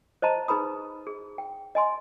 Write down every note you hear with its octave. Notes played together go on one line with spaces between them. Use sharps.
C5 D#5 A5 A#5
D#4 G#4 B4 A#5 B5 D#6
G#4
G5
D#5 G#5 C6